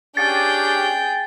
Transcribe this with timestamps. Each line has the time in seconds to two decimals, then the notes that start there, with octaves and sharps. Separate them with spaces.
0.17 C#4 D4 G4 G#4 G5 A6